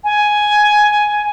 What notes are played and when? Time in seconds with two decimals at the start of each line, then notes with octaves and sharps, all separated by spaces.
0.04 G#5